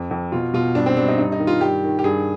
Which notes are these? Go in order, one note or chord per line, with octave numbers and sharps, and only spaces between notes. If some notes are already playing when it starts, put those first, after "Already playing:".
Already playing: F2
F2
B2 F4
B2 F4
G2 D4
C4
G2 D4
D#4
G2 D#4
D#4
D#3
F4
G2 G4
D#3
G4
G2 G#4